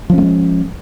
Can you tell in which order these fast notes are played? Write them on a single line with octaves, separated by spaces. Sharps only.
F3 C#4 A3 G#3